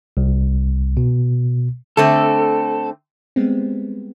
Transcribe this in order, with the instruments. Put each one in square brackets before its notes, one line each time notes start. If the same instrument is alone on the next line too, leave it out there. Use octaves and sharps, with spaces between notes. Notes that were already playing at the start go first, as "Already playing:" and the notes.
[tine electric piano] C2
B2
[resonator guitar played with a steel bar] D3 A3 C4 [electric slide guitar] A4
[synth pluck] G3 G#3 B3 C4